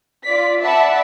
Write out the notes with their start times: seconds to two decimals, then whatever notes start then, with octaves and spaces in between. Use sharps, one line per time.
0.24 F4 D5 B6
0.61 D5 E5 F#5 A5 B5